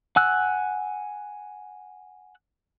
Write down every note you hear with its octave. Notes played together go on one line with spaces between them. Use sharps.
F#5 G#5 E6 F#6